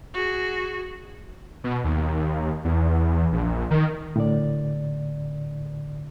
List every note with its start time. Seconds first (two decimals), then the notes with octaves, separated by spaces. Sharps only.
0.14 F#4 G#4
1.64 B2
1.84 D#2
2.65 E2
3.33 A#1
3.71 D#3
4.16 A2 D3 D5